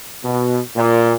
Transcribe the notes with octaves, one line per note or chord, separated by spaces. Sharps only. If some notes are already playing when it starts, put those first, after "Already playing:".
B2
A#2